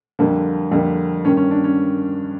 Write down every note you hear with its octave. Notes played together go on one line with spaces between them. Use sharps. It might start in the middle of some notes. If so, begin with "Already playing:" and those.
F2 D3 G3 A#3
F2 D3 G3 A#3
G2 D#3 G3 A#3 C#4
C#4
D4
C#4